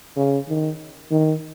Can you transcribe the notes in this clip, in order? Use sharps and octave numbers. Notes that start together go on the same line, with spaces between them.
C#3
D#3
D#3